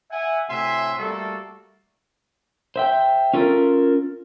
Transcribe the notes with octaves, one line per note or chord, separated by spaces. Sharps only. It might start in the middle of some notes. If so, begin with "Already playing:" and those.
E5 F#5 G#5
A2 C3 F#4 E5 G#5 C6
G3 A3 A#3 F#4 A4
C5 E5 G5
C#4 F4 A4 A#4